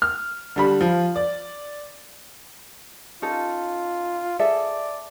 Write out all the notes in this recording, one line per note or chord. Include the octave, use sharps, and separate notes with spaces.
F6
D3 G3 B5
F3
D5
C#4 D#4 F4 A4
G#4 A4 D5 E5